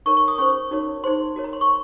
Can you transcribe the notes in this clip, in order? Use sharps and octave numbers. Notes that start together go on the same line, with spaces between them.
D#4 A#4 C#5 C#6
C#6
D#6
C#4 G#4 C5 C#6
D#4 F#4 A#4 C#5
D#4 G#4 C5 C6
F#4 A#4 C#5
A#5
C6
C#6